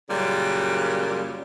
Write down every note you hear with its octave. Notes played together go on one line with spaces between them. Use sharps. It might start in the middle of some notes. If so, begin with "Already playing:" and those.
F#2 A#2 C#3 G3